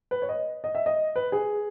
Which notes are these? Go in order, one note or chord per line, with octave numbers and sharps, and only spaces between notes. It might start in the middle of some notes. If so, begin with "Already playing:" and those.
B4
C#5
D#5
D#5
E5
D#5
B4
G#4